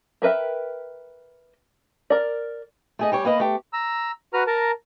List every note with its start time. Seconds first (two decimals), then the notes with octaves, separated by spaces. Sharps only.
0.22 B3 A#4 B4 E5 G5
2.10 A#4 D5
2.99 A3 G#4 D#5
3.12 G3 G4 C#5
3.25 A#3 B4 D#5
3.40 A3 G4
3.73 A#5 E6
4.33 F#4 B4 A#5 F6
4.47 A#4 A5 A#5